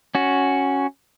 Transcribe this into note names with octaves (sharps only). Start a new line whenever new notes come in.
C#4 F#4